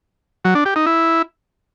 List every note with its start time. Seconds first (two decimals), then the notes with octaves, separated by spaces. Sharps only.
0.45 F#3
0.55 D4
0.65 G4
0.76 D#4
0.86 E4